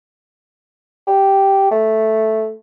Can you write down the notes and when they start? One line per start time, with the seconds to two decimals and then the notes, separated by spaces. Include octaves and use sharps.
1.07 G4
1.71 A3